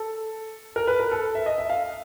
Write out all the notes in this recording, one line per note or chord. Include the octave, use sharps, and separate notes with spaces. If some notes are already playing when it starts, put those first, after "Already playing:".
Already playing: A4
A#4
B4
A#4
A4
E5
D#5
E5
F5